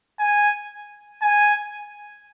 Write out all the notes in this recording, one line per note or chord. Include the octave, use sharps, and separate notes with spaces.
G#5
G#5